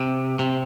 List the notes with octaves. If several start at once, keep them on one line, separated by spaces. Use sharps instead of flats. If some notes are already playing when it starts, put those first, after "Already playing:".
Already playing: C3
C3